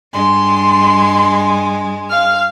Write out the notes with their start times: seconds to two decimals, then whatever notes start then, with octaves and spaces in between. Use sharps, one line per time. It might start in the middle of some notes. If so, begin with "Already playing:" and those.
0.13 G2 G#3 C6
2.09 F5 F6